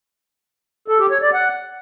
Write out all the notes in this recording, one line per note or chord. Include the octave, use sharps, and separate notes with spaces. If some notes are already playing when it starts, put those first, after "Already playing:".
A4
G4
C#5
D5
F#5